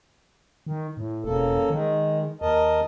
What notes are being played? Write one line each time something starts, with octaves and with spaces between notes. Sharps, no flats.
D#3
A2
E1 C#3 A#3 A4
D#3 G#3
D#2 A#4 D#5 A5